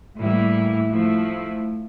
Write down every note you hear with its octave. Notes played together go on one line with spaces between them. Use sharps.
A2 E3 G3 A#3 E4
F3 A3 E4